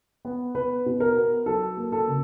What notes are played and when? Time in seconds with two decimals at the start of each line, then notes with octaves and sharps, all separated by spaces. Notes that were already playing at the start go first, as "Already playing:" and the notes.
0.25 B3
0.55 B3 B4
0.86 B2
1.00 A#4
1.16 B3
1.46 F#3 A4
1.77 A#3
1.92 A4
2.07 C#3